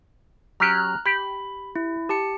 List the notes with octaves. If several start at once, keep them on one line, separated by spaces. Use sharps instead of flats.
F#3 C#4 G4 A#5 F6 F#6
G4 B5
E4
G4 A5 C#7